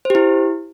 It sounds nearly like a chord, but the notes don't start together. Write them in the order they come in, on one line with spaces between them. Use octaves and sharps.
C5 G4 E4